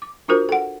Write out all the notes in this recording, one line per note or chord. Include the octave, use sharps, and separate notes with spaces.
D6
D4 F4 F#4 A#4 C5
A4 F#5